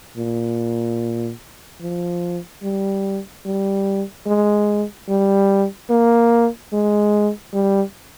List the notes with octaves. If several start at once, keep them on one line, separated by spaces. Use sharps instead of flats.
A#2
F3
G3
G3
G#3
G3
A#3
G#3
G3